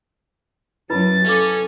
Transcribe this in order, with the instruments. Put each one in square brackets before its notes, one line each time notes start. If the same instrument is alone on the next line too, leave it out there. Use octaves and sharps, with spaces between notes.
[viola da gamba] F#2 F#3 [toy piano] E4 B4 B5 [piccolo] A6
[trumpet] C#4 [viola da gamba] A4 [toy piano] F5 D6